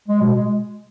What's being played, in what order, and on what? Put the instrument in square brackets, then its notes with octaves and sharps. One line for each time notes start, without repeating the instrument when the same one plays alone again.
[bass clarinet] G#3
B2
G#3